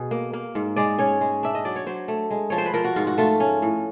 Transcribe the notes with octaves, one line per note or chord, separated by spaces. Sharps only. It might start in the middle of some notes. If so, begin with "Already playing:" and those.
Already playing: B2 G#4
A#3
A#3
G#2
G#3 D5
C#4 C#5
G#3
D4 E5
D#5
F#3 D5
C#5
F#3 C5
A3
G#3
F3 C#5
C5
B4
F3 A#4
F#4
G#2 F4
F#4
A3 F4
C#4
A2